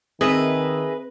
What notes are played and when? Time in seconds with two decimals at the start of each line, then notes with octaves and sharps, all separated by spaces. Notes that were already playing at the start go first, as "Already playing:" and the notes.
0.21 D#3 C4 G#4 B4 D#5 E5